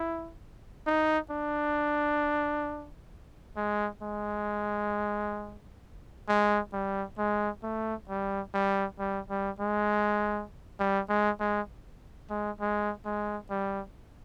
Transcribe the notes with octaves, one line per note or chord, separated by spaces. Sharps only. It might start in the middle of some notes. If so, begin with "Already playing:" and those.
Already playing: E4
D#4
D4
G#3
G#3
G#3
G3
G#3
A3
G3
G3
G3
G3
G#3
G3
G#3
G#3
G#3
G#3
G#3
G3